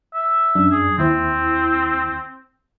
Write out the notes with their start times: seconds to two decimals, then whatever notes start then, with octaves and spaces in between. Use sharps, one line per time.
0.14 E5
0.55 F#2 D4
0.72 G#4
0.98 D#2 C4 E4 C5